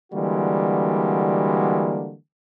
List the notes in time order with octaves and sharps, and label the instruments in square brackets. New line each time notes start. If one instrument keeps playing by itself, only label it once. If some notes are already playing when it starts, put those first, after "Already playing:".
[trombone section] D3 E3 G3 G#3 A#3 F#4